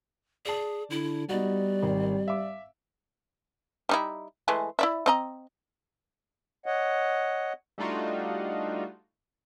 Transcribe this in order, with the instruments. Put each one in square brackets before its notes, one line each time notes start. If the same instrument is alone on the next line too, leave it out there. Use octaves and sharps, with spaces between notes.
[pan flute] G#4 [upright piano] D5 A5
[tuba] D3 [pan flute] E4
[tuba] G3 [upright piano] B3 D#4 F#4 [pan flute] D5
[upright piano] G#1 D#3
E5 F5 D6
[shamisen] G3 D#4 E4
E3 G#3 A3
E4 D5 E5
C4 D#5 A#5
[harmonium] C#5 D#5 F#5
[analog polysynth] G3 A3 D4 D#4 F4 F#4